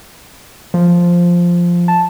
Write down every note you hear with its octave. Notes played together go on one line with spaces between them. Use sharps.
F3
A5